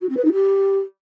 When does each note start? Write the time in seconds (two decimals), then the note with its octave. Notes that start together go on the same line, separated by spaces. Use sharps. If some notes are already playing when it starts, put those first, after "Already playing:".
0.01 F#4
0.09 C4
0.16 B4
0.24 D#4
0.32 G4